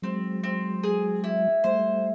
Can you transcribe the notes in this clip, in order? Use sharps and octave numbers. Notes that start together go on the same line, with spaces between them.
F#3 G#3 C4
C4
G#4
E4
G3 A3 C5